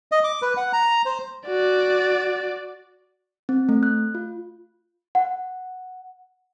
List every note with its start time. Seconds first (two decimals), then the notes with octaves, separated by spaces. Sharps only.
0.12 D#5
0.24 D6
0.42 B4
0.57 F#5
0.73 A#5
1.05 C5
1.47 F#4 D5
3.49 C4
3.69 A3
3.83 F#6
4.15 F4
5.15 F#5